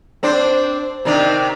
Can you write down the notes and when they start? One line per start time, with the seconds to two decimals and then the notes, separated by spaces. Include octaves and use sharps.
0.23 C4 D4 C5
1.05 C3 D#3 D4